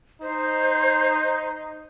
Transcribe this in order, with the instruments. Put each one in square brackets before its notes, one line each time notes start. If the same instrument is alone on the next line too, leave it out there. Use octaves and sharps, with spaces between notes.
[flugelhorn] D#4 [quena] C5